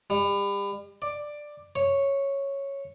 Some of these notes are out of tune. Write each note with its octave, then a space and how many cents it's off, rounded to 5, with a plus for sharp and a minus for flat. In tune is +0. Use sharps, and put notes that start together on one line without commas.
G3 +35
D5 +10
C#5 -5